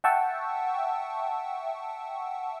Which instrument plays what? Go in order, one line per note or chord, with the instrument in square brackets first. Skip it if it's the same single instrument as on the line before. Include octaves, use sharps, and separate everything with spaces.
[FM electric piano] E5 F#5 G5 A5 C#6 E6